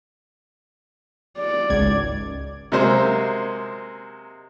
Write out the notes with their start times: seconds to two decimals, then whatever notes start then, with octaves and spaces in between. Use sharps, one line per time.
1.38 D5
1.70 G#1 C#2 G#6
2.72 C3 F#3 G#3 A#3 C5